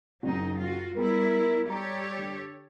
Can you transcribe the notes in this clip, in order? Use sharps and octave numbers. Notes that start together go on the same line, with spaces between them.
F#1 F#2 F#3 D#4
F4 F#4
G3 B3 E4 G#4 A#4 B5
G3 G4 A4 C#5 A#5
D3